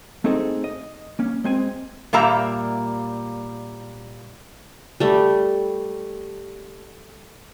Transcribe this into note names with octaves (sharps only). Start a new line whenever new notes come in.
A3 C4 D#4 G#4 A4 D#5
D#5
A#3 C#4
G#3 C4 G#5
A#2 G3 A#3 E5 A#5
G3 A3